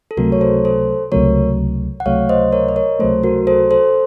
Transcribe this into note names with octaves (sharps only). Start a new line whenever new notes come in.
A4
C#2 C3 F#3 A3 F#4 A#4
C#5
A4 C5
A4 C5
C#2 C3 F#3 A3 A#4 C#5
F#5
C#2 C3 F#3 A3 C#5 F5
C5 D#5
A#4 C#5
D#5
A#4 C#5
C#2 C3 F#3 A3 A4 C5
F#4 A#4
A4 C5
A4 C5